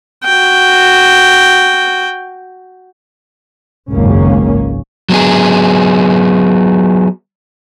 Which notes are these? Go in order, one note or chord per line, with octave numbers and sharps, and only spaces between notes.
F#4 G5
G#1 C#2 F#2 A#3 C#4
F#3 B3 G#4